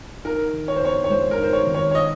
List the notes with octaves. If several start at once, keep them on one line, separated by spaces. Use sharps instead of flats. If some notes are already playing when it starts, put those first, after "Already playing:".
D#4 A#4
D#3
C#5
C5
F2 C#5
C#5
G#3 C5
A#4
D#4 C5
C#5
D#3
C#5
C#5
D#5